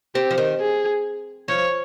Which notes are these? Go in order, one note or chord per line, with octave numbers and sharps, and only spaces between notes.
C4 G4
F3
D#3
G#4
F3 C#5